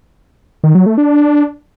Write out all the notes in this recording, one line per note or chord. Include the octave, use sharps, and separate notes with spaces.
D#3
F#3
A3
D4